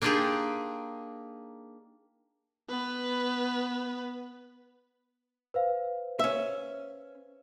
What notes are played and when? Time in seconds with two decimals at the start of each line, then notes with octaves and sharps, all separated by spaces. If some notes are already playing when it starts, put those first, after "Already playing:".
0.02 A#3 D4 D#4 F4 G4 G#4
2.69 B3 B4
5.54 B4 C5 F5
6.19 C#4 E5